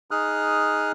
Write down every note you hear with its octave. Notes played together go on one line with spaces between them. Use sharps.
D#4 G#4 D#6 F6 F#6